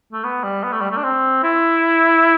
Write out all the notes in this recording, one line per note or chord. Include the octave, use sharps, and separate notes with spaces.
A3
B3
G3
B3
A3
G3
A3
D4
C4
E4